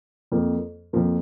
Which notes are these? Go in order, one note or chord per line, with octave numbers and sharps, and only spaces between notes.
F2 F3 A#3
F2 F3 A#3